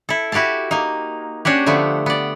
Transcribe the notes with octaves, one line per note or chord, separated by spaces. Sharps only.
E4 A4
E4 F#4 G4 F5 A5
A#3 D#4
C#4 D4 F#4 G4
D3 F3 A3 B3
B3 D5